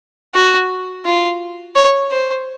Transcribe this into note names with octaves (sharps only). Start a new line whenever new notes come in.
F#4
F4
C#5
C5